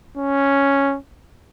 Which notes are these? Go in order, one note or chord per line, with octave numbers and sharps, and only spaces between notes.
C#4